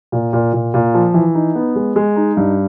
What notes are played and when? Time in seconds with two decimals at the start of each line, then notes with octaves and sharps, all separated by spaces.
0.12 A#2
0.33 A#2
0.53 A#2
0.74 A#2
0.94 F3
1.14 E3
1.35 D#4
1.55 B3
1.76 G#3
1.96 G#3
2.16 D#4
2.37 G2